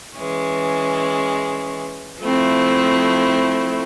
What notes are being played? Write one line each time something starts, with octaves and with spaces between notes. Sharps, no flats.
E3 G#3 C#4
F3 A3 C4 E4